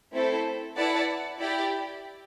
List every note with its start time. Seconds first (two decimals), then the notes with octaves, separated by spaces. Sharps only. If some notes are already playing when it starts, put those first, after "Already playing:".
0.12 A3 C4 E4 A4 C5
0.76 E4 B4 D5 F#5 A5
1.40 E4 G4 D5 G5